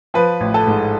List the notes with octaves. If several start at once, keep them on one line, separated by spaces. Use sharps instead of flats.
F3 B4
A1
A4
G#2